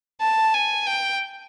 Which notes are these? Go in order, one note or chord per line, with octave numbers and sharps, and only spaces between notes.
A5
G#5
G5